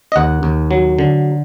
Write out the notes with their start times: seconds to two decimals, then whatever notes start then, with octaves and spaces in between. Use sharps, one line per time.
0.12 D#5
0.16 D#2 F#5
0.43 D#2
0.71 F#3
0.99 D3